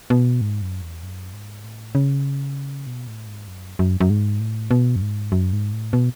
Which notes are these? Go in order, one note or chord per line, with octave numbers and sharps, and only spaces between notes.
B2
G#2
F#2
E2
F#2
G#2
A2
C#3
B2
A2
G#2
F#2
F#2
F#2
G#2
A2
B2
F#2
G#2
F#2
G#2
A2
B2